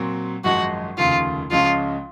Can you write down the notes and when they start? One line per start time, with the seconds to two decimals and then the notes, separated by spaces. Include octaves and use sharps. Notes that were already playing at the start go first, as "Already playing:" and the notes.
Already playing: A#2 F#3 C4
0.44 G#1 F#2 F3 G#3 F#4
0.98 F1 D#2 C#3 F4
1.51 C#2 C#3 F3 G#3 C#4 F4